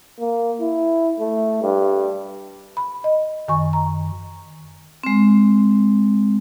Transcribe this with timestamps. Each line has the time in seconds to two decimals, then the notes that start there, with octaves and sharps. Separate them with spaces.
0.19 A#3
0.61 E4
1.20 A3
1.62 G2
2.77 B5
3.04 D#5
3.48 F#2 D#3 G#5 C#6
3.73 A#5
5.03 G#3 C4